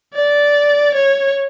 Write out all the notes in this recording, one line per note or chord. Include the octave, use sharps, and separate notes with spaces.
D5
C#5